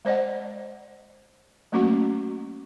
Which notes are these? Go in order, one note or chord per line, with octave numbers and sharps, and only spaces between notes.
G#3 C5 D5 D#5 F#5
F#3 A3 A#3 C#4 F#4 C#6